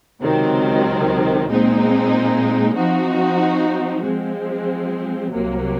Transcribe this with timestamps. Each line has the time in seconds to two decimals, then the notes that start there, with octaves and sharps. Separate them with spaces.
0.22 C#2 C3 D#3 F#3 C4
1.49 A#2 G#3 C4 D#4
2.76 F3 C4 D#4 F#4
4.03 F3 G#3 C4
5.31 C2 C3 F#3 A#3